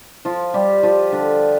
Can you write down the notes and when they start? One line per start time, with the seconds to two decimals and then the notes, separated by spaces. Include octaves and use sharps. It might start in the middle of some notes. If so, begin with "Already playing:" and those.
0.25 F3 F4
0.54 G3 G4
0.83 F3 F4
1.12 D3 D4